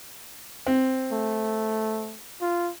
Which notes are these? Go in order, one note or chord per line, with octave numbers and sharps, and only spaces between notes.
C4
A3
F4